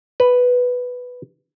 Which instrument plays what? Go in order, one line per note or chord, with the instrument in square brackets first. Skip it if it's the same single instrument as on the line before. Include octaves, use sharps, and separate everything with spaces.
[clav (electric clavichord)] B4